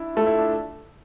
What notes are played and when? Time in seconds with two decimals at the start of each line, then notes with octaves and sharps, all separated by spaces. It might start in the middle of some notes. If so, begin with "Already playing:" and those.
Already playing: D4 E4
0.15 A3 F4
0.26 E4
0.39 D4